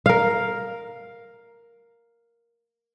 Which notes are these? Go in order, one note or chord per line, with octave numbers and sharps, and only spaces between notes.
A#4 F5